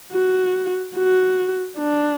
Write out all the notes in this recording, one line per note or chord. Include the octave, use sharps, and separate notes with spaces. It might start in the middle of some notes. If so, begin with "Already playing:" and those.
F#4
F#4
D4